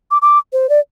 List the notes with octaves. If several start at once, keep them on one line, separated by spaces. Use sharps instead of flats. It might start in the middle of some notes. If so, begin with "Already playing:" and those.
D6
D6
C5
D5